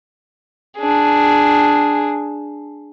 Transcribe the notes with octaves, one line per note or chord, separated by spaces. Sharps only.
D4 G#4